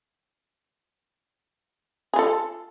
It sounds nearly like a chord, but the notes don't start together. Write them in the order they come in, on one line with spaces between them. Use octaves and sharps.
G#4 F4 A4